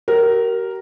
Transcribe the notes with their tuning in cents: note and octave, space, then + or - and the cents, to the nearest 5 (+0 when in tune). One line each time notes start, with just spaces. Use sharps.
G4 -45 A#4 +0 C#5 -15